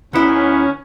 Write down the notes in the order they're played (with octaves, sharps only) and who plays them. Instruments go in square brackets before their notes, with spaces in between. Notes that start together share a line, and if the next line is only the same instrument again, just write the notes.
[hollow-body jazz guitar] D2 E4 [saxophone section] G#2 B3 [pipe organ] C#4